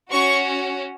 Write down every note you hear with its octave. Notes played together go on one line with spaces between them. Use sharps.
C#4 F#4 C#6